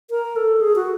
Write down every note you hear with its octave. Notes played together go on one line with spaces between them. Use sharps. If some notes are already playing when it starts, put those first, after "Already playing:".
A#4
A4
G#4
F#4